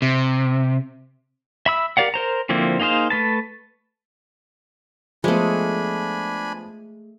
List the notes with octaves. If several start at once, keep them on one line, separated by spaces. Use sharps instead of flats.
C3
E5 B5 E6
G4 A#4 D5 F5 F#5
A#4 C5 A#5
D3 F3 A#3 C4 E4
A#3 D#4 G#4 C5 F5
A3 B4 A5
F3 G#3 A3 B3 D4 G#5 B5